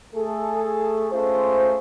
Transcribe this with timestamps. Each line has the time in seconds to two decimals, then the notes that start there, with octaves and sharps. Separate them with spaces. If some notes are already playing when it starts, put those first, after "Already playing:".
0.15 A3 G#4 A4
1.12 A3 C#4 F4 G#4 C5